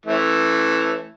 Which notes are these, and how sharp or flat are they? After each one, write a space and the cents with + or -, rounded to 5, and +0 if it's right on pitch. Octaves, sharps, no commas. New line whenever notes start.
E3 +0 A3 +0 C#4 -40